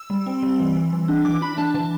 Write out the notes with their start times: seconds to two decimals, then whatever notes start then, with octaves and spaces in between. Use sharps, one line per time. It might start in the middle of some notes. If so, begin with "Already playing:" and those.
Already playing: E6
0.10 G3
0.26 C4
0.42 G3
0.59 E3
0.76 E3
0.93 E3
1.08 D4
1.25 E3 D6
1.41 D4 B5
1.57 D4 A5
1.74 E3 A5